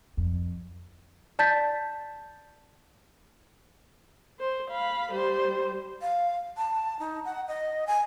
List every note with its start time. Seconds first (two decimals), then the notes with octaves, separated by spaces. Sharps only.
0.17 F2
1.39 D5 A5 G6 A6 B6
4.39 C5
4.71 F5 B5
5.13 G3 C5
6.02 F5
6.57 A5
6.99 D#4
7.25 F#5
7.48 D#5
7.87 G#5